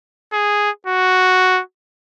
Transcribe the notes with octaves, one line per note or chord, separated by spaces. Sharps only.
G#4
F#4